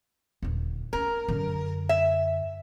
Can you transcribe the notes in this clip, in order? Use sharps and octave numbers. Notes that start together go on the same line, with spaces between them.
D#1 D2
A3 C#4 A#4
F#2 D3
E5